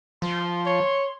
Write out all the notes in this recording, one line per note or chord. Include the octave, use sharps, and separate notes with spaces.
F3 C6
C#5